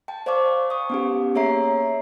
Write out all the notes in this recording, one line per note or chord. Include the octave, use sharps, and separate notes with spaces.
G5 A5
C5 D5 F5 A5 C#6 D6
C#6 D#6
B3 C#4 G4
A#3 G#4 C#5 E5 A#5 C7